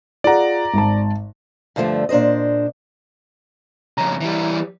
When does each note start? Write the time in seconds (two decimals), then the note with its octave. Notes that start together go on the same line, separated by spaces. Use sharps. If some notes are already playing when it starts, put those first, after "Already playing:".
0.24 F4 G#4 D5 F#5 A#5
0.74 G#1 A5
1.76 G2 D3 F3 A3
2.09 A#2 D4 B4 C5 D#5
3.98 F2 C#3 A#5
4.21 E3 G3